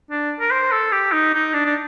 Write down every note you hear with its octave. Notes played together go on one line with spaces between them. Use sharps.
D4
A#4
C5
A4
G4
D#4
D#4
D4
D4